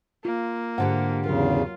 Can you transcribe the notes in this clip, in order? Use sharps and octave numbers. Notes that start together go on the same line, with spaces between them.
A#3 F4
G#2 D3 G4 F#5
E2 C#3 F#3 F4 A#4